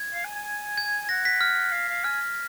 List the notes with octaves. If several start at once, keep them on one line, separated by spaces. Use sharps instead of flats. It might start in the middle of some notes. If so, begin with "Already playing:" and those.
Already playing: G#6
F5
G#5
G#5
G#6
F#5 A#6
B6
F6
F5
F5
G#5 F6